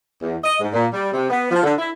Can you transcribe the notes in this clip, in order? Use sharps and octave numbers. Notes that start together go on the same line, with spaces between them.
E2
D#5
G#2
A#2
G3
C3
B3
F3
D3
E4